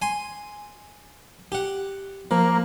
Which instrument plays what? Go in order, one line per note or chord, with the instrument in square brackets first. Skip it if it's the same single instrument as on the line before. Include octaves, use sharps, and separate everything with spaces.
[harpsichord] G#5 C6
G4 F#5
[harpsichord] F3 [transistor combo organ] A#3